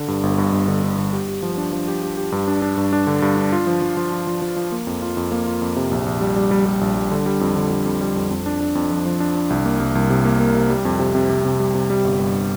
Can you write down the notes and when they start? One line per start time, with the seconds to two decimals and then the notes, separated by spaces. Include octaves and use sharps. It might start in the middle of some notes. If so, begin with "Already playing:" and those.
Already playing: D3
0.08 G2
0.23 G1
0.38 G2
0.53 G1
0.68 D3
0.83 D3
0.98 G1
1.13 G4
1.28 G4
1.42 F3
1.57 D4
1.73 F3
1.88 G4
2.03 G4
2.17 G4
2.32 G2
2.48 D4
2.62 D4
2.77 G2
2.93 D4
3.07 D3
3.22 G2
3.37 D4
3.52 F4
3.67 F3
3.82 F3
3.97 F3
4.12 F4
4.27 F3
4.42 F3
4.56 F3
4.72 A#3
4.87 F2
5.02 F4
5.17 F2
5.32 A#3
5.46 F4
5.62 F2
5.76 C3
5.91 A#1
6.06 A#1
6.21 G3
6.36 G3
6.51 G3
6.66 G3
6.81 A#1
6.96 G3
7.12 D3
7.26 G3
7.41 F2
7.56 D3
7.70 G3
7.86 F2
8.01 G3
8.16 F2
8.31 F2
8.46 D4
8.61 D4
8.75 F2
8.90 F3
9.05 F3
9.20 D4
9.35 D4
9.50 C2
9.65 A#3
9.80 C2
9.95 C2
10.10 C3
10.25 A#3
10.40 A#3
10.55 C3
10.70 G3
10.85 F2
11.00 C3
11.15 C3
11.29 C3
11.45 C3
11.60 G3
11.75 C3
11.90 G3
12.05 G1
12.20 G2